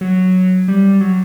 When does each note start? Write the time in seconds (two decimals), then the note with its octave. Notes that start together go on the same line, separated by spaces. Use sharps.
0.01 F#3
0.68 G3
1.01 F#3